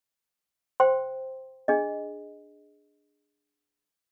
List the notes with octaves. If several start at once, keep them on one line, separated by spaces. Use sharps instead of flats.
C5 G5 C6
D4 G#4 D#5